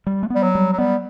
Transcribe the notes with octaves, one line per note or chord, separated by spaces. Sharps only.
G3
A3
G3 B3
F#3
G3
F#3
G3 B3